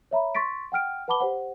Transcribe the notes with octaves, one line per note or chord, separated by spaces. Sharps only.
C#5 E5 A#5 B5
C6 C#6 A6 B6 D7
F#5 G5 F6 D7
B4 F#5 A5 B5 D6 G7
G4 C5 F#5